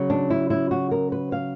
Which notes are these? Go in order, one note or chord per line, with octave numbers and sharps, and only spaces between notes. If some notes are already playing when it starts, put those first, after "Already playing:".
Already playing: C#3 F#3
D4
E4
E4
F#4
A#4
B4
F5